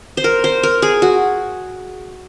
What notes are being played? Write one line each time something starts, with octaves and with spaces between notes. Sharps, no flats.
C5
A#4
C5
A#4
G#4
F#4